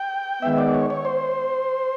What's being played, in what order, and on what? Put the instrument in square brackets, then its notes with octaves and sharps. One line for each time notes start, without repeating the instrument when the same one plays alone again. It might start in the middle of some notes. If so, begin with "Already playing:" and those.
Already playing: [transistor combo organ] G5
[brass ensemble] D#3 G#3 B3 [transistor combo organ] E5
[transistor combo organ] D5
C#5
C#5
C5